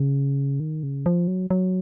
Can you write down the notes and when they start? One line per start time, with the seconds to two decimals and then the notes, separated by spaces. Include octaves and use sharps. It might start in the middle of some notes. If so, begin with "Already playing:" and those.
Already playing: C#3
0.60 D#3
0.83 C#3
1.06 F3
1.28 F#3
1.50 F#3